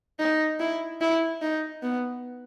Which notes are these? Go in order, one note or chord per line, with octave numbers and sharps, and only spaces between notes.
D#4
E4
E4
D#4
B3